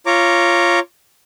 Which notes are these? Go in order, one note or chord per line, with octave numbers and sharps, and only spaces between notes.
F4 C#5 A#5 D6